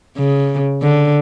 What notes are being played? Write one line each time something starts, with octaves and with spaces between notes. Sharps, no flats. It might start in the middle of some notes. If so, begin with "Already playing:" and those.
C#3
D3